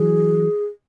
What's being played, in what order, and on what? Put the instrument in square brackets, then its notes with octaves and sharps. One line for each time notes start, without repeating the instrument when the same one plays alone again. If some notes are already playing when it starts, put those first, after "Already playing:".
Already playing: [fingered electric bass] E3 F#3 [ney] G#4